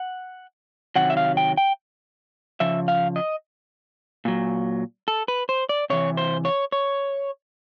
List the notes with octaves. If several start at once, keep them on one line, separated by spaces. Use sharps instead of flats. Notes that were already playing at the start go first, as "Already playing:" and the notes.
Already playing: F#5
C3 D#3 F#3 F#5
E5
F5
G5
G5
C#3 F3 E5
F5
D#5
A#2 F#3
A4
B4
C5
D5
C3 E3 C#5
C5
C#5
C#5